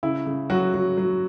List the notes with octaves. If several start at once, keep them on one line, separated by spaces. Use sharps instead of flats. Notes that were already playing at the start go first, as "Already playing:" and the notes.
C#3 E4
C#3
F#3 F#4
F#3
F#3